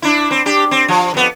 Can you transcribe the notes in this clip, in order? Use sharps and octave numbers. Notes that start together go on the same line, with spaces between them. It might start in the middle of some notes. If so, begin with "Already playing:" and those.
D4 E4
C4
D4 G4
C4
F3
F2 B3